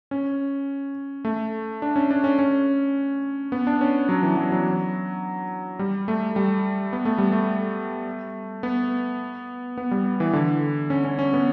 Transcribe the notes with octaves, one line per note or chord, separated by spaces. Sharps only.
C#4
A3
D4
C#4
D4
C#4
C#4
B3
D4
C#4
F#3
E3
F#3
F#3
G3
A3
G3
B3
A3
G3
A3
B3
B3
G3
E3
D3
C#4
C#4
C#4
B3